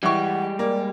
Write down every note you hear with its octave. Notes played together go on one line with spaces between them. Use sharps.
E3 G3 G#3 G4 F#5 C#6
A#3 D5